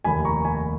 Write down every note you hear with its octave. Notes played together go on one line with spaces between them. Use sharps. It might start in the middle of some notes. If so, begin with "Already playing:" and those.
F1 D#2 D#3 G#5 B5
A#5 C#6
G#5 B5